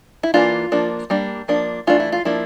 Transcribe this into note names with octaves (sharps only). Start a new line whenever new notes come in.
E4
E3 A#3 D4 F4
F3 A#3 D4
G3 A#3 D4
F3 A#3 D4
E3 A3 D4 F4
E4
F4
F3 A#3 D4 E4